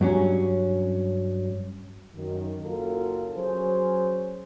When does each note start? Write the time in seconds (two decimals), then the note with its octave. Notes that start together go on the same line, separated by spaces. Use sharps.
0.01 G2 F#3 C#4
2.15 F#2 D#3
2.63 F#1 F#2 F#3 F4 A4 A#4
3.37 F#3 C#4 G#4 C5